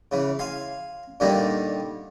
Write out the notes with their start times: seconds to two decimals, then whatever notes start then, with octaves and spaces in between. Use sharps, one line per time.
0.12 C#3 E3
0.39 F5 G#5 C6
1.20 A#2 D3 D#3 G3 D#4